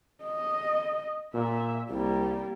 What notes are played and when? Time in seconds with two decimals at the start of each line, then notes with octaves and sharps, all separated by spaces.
0.24 D#5
1.34 A#2 E5
1.90 C2 G3 A#3